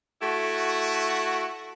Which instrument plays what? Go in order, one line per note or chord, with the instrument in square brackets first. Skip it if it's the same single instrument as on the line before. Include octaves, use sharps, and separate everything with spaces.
[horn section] A3 E4 F#4